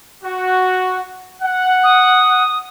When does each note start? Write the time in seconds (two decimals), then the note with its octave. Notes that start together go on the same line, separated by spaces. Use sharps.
0.24 F#4
1.42 F#5
1.84 D#6